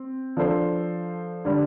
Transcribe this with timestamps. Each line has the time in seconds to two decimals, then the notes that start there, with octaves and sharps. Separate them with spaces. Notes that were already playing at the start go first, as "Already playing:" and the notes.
Already playing: C4
0.37 F3 D4 A4 C5
1.45 D3 G3